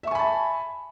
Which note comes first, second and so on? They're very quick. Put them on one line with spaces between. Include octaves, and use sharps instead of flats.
E5 C#6 G#5 B5 A5